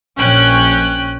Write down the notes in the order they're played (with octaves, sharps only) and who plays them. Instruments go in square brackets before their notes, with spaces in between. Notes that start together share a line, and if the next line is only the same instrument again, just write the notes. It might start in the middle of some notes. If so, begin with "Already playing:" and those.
[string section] A#1 C#4 G5 F#6